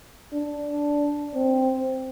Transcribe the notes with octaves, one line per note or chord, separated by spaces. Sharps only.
D4
C4